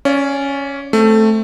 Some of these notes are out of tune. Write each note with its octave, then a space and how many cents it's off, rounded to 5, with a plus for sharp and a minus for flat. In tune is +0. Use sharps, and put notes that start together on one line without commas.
C#4 +0 D5 -25 F5 +0
A3 +0 C4 +0